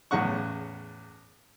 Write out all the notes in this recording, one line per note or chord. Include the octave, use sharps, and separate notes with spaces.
E2 A2 C#3 F#5 C#6